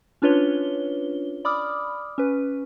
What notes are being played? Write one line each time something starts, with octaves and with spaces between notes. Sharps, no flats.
C#4 D4 F4 B4 C#5 G7
D5 B5 D6 D#6 F6
C#4 B4